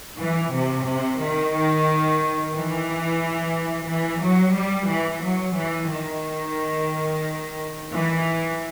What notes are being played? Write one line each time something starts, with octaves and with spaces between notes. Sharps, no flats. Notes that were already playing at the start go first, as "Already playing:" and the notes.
E3
C3
C3
D#3
E3
E3
F#3
G3
E3
F#3
E3
D#3
E3